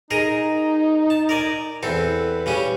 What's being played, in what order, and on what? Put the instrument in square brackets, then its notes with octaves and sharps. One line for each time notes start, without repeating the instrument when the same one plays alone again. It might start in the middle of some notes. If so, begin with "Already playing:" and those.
[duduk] D#4 [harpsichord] G#4 A#4 D#5
[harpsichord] A5
A#4 D5 G#5
[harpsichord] E2 C4 A4 [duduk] B4
[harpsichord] C#3 G3 C#4